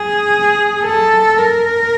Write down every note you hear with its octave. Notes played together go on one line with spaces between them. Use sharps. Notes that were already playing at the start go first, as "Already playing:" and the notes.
Already playing: G#4
A4
A#4